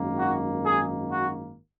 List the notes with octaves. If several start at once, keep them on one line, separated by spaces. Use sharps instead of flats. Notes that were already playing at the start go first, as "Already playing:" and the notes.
Already playing: G#1 F#2 D#3 A#3
F#4
G#4
F#4